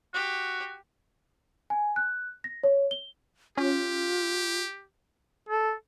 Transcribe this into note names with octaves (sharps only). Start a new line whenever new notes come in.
F#4 G4
G#5
F#6
A#6
C#5
G7
C#4 F4 G4
A4